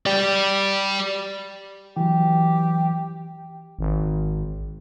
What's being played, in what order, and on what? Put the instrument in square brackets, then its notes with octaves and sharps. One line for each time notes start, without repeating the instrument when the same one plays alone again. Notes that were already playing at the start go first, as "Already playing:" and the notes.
[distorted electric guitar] G4 D5
[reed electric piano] E3 F#3 [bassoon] G4
[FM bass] G#1